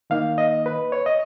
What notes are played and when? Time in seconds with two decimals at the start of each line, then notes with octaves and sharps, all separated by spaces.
0.10 D#3 A#3 D#4 F5
0.38 D#5
0.66 B4
0.92 C#5
1.06 D#5